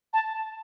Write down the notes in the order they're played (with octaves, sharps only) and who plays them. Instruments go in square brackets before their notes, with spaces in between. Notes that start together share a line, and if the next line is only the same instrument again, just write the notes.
[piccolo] A5